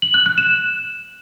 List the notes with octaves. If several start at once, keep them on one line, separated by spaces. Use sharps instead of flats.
F#7
F#6
F#6
E7